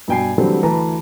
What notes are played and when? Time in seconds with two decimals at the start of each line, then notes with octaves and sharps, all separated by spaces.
0.08 G2 B2 G5 G#5 C7
0.38 D3 E3 F#3 G3 A3 C4
0.63 D2 E3 B4 A5 A#5